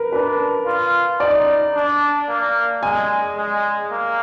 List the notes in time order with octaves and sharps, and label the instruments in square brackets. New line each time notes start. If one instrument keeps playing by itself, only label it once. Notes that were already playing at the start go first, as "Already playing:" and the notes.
Already playing: [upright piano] A#4 B4
[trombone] D4 [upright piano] B4
[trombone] F4
[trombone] D#4 [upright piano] D5
[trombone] D4
A#3
[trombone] G#3 [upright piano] G#5
[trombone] G#3
A#3